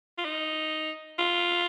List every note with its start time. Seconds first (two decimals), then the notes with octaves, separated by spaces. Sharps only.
0.18 F4
0.25 D#4
1.19 F4